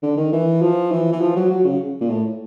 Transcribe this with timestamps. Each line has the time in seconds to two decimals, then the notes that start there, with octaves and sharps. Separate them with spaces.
0.03 D3
0.17 D#3
0.33 E3
0.62 F3
0.92 E3
1.13 E3
1.21 F3
1.36 F#3
1.51 F#3
1.66 C#3
2.01 A#2
2.10 A2